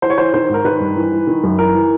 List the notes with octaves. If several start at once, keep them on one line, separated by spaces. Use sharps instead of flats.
E3 C5
C#5
E3 C5
D#3 C5
G#2 A#4
D#3 B4
G2
E3
E3
D#3
F#2
E3 A#4
E3